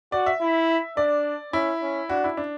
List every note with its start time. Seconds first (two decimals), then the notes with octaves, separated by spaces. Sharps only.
0.12 F#4 D5
0.26 E5
0.41 E4
0.97 D4 D5
1.53 C#4 E4
1.82 C#4
2.09 D4 F#4
2.24 E4
2.37 D4